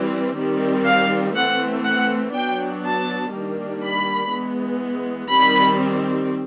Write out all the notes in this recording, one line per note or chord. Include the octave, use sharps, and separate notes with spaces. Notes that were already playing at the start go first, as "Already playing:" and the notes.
Already playing: E3 G3 C4
D#3 G3 C4
F5
E3 A3 C4 F#5
F#5
F#3 B3 D4 G5
A5
D#3 G3 A#3 D4
B5
E3 G#3 B3
D#3 G3 C4 B5